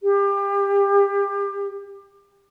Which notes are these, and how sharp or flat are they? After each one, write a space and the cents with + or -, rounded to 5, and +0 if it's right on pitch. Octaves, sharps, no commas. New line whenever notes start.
G4 +30